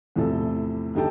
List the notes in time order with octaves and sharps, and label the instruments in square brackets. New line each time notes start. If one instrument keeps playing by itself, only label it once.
[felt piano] E2 A2 C3 F3 A4
G1 D#4 G4 A4 G5 A5